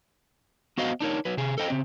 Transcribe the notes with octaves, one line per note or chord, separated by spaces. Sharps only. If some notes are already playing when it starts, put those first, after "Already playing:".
B3 F#4 C5 D#5 F5
D4 D#4 A#4 C#5
F#3 B4
C3 G#4
A4 C5 D#5 G5
C#3 C4